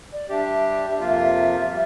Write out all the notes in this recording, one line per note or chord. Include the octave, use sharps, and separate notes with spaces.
D5
G3 D4 G4 E5
F2 C3 F3 A#3 F4
G3